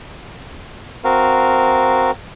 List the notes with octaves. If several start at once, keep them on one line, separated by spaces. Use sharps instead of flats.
C4 F#4 A#4 F5